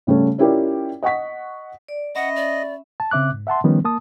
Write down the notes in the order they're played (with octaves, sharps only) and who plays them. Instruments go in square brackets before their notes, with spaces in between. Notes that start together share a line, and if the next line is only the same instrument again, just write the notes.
[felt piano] C#3 G3 A3 C#4
C#4 E4 F4 G4 A#4 D5
D#5 F#5 C#6 B6
[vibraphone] D5
[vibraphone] C#4 E5 B5 [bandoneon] D#5 [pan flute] F#5
[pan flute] D5
[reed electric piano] A5
C#3 C4 E5 D6 F#6
G#2
E5 F#5 A5 C6
D#3 F3 G3 B3 C#4
A#3 A5 D#6